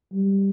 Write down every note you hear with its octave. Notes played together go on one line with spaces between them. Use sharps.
G3